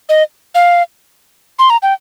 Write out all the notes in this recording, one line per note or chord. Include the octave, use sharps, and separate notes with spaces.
D#5
F5
C6
A#5
G5